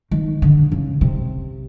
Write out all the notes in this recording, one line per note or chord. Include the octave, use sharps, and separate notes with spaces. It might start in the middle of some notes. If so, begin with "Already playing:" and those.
D#3
D3
C#3
C3